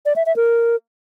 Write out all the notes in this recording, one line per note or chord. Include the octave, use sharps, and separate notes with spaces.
D5
E5
E5
A#4